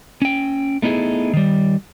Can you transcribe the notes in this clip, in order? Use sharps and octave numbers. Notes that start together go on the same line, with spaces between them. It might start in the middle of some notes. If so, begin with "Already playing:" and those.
C#4 G5
A3 B3 D#4 E4 G#4
D#3 G3